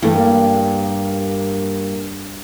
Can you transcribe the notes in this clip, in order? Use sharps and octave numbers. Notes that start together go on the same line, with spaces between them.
G2 E3 A3
A#3